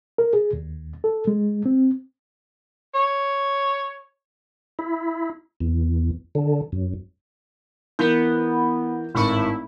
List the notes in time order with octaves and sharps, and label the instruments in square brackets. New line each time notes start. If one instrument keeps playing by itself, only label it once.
[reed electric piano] A#4
G#4
D#2
A4
G#3
C4
[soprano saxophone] C#5
[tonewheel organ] E4
E2
D3
F#2
[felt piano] E3 A#4 G6 [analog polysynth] B3
[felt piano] G#1 C#6 [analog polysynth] A2 E4